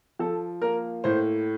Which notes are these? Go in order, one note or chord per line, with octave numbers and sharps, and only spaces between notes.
F3 A4
A#3 A#4
A2 C5